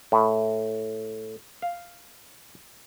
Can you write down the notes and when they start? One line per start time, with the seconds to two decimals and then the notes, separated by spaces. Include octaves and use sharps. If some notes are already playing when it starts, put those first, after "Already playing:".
0.12 A2
1.62 F5